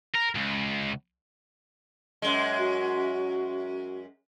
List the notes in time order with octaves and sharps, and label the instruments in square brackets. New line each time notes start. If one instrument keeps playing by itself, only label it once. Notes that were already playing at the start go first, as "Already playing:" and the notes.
[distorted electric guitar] A#4
C#2
[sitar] F#2 G#3
[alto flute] F#4